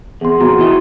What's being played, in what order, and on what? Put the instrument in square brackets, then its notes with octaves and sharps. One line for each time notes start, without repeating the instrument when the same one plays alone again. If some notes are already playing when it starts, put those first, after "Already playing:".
[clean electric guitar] E2 [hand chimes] G#4 C6
[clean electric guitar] E2 A#2 [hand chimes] F#4 A#5 C6
[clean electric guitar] E3 E4 D#5